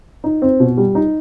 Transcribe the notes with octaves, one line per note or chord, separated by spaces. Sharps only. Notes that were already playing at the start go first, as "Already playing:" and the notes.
D#4
C4
B2
G3
D#4